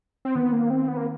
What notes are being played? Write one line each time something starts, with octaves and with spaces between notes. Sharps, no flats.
C4
D#3 B3
A#3
C4
B3
A#3